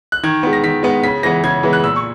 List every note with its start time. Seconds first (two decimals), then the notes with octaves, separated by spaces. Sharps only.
0.12 F#6
0.23 D#3 G#6
0.43 G#3 B3
0.53 A#6
0.63 D#3 B6
0.83 G#3 B3
1.03 C#3 B6
1.23 E3 G#3 B3 A#6
1.44 C#3 G#6
1.63 E3 G#3 B3
1.73 F#6
1.83 A#2 E6
1.96 C#6